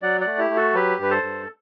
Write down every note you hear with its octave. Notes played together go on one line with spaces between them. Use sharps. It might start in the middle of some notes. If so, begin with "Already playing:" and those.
F#3 D5 F#5
D5 F#5
A3
E4 G4
A3
F#4 A4
F#3 G4 B4
G2 B4
A4 C5
G2